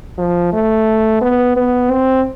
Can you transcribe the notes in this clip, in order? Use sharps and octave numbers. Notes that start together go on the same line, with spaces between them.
F3
A3
B3
B3
C4